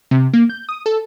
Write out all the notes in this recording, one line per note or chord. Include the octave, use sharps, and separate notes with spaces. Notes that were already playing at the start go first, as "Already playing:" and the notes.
C3
A#3
G6
D#6
A4